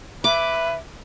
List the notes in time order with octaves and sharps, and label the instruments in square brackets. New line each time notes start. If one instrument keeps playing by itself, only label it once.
[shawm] B4 [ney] E5 [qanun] D6